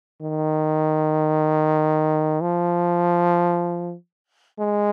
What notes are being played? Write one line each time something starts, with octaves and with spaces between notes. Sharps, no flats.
D#3
F3
G#3